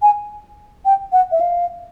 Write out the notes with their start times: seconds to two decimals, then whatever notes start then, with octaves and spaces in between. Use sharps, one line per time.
0.02 G#5
0.85 G5
1.12 F#5
1.32 E5
1.40 F5